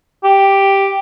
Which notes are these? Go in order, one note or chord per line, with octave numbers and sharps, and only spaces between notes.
G4